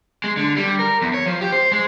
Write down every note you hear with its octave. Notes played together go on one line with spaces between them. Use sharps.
G#3
D3
G3
A#4
E2
C#5
F3
G4
C5
G#3